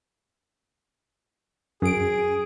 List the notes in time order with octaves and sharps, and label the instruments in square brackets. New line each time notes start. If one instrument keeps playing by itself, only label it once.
[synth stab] F#2 D7 [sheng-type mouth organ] G#4